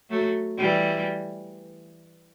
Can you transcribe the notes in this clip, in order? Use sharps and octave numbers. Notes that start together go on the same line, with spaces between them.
F#3 A3
E3 G3